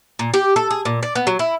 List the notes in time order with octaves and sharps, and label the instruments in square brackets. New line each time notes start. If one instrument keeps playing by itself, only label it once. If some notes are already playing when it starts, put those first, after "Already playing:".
[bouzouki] A#2
G4
A4
G#4
A#2
D5
B3
F#3
E4